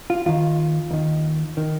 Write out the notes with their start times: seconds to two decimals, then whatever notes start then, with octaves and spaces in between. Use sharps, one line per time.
0.10 F4
0.26 D#2 D#3 F4
0.91 D#2 D#3
1.57 D#3